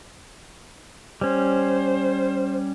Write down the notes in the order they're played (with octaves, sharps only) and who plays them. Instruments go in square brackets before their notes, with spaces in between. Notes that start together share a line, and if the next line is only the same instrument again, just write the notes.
[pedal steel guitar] G3 C#4 [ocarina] C5